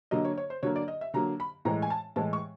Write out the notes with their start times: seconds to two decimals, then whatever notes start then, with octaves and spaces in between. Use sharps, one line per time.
0.11 D3 F#3 A#3 D#5
0.25 C#5
0.38 C#5
0.50 C5
0.63 D3 F#3 A#3 C#5
0.76 D5
0.88 D#5
1.01 E5
1.14 D3 F#3 A#3 A#5
1.40 B5
1.65 A2 E3 G#3 A#5
1.82 G#5
1.90 A5
2.16 A2 E3 G#3 A5
2.33 C#6